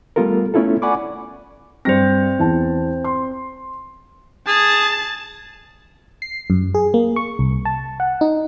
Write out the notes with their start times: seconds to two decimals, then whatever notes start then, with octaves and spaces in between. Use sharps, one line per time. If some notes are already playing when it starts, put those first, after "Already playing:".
0.16 G3 A3 B3 F4 A4 A#4
0.54 A3 B3 C#4 E4 F4 A4
0.82 D5 F#5 G#5 B5 C#6 D6
1.85 G2 C4 C5 A#6
2.39 E2 E3 A5
3.04 C6
4.47 G#4 A5
6.22 C7
6.50 F#2
6.74 G#4
6.94 A#3
7.16 C#6
7.39 C2
7.65 A5
8.00 F#5
8.21 D#4